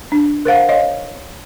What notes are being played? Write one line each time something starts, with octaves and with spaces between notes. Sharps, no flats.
D4
A#4 C5 F5 F#5
C#5 D#5 F5